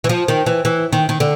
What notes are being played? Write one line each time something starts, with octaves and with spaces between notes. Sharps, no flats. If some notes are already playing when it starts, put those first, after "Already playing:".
E3
F3
D#3
E3
E3
D#3
D#3
D3